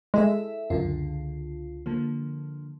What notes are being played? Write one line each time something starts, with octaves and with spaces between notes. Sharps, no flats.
G#3 E4 A4 E5
C#2 F#2 D3 F4
D3 F3 A#3